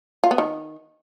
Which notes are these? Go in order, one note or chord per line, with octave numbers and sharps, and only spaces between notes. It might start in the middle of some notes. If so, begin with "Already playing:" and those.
F4
B3
D#3